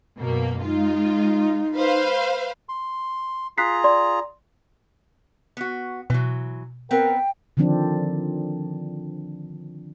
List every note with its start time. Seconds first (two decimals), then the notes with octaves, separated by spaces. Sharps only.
0.19 F#2 B2 A#3
0.63 G#3 D#4 F4
1.76 B4 C5 F5
2.69 C6
3.58 F4 G#4 A#5 F#6 B6 C7
3.84 D5 C6
5.57 B3 F#4
6.10 B2 E3 F#3
6.91 B3 C4 A#4 G5
7.57 D3 D#3 F3 C4 D4